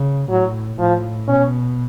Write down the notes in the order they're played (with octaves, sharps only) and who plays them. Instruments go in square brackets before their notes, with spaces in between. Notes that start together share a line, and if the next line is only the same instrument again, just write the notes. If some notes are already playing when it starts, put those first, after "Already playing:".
Already playing: [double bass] C#3
[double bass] A2 [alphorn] F#3
[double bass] A2 [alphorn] F3
[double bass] B2 [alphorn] C#4